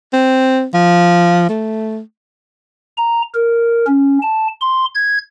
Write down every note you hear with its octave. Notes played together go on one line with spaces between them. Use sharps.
C4
F3
A3
A#5
A#4
C#4
A5
C6
G#6